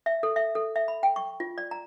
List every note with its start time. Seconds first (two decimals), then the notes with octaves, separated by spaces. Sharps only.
0.06 E5
0.23 A4
0.36 E5
0.55 A4
0.76 E5
0.88 B5
1.03 G5
1.16 C#6
1.40 F4
1.58 D5
1.71 A#5